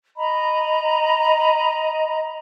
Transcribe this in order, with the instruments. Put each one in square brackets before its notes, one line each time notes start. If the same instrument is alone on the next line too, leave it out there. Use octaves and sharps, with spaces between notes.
[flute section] D#5 A#5 B5